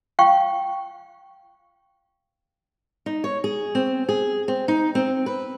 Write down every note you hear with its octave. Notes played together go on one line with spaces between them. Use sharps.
F5 G5 C#6
D#4
C#5
G#4
C4
G#4
C4
D#4
C4
B4